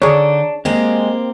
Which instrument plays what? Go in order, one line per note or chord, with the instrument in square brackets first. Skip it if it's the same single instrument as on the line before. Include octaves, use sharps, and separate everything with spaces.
[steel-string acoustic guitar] D3 D#4 [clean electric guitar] D4 [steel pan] G#4 C#5
[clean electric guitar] G#3 [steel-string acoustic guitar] A#3 C4 G4